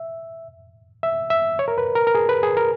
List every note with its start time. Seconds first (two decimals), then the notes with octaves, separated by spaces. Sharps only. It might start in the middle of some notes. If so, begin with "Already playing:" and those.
Already playing: E5
1.03 E5
1.30 E5
1.59 C#5
1.68 A#4
1.78 B4
1.95 A#4
2.07 A#4
2.15 G#4
2.29 B4
2.43 G#4
2.57 A#4